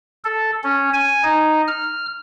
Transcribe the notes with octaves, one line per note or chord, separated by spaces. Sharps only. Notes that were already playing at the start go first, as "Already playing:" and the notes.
A4
C#4
G#5
D#4
F6